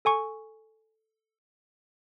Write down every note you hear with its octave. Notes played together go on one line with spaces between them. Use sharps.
A4 G#5 C#6